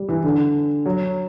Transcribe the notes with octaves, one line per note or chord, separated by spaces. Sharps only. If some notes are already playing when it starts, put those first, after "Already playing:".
Already playing: G3
E3
D3
F#3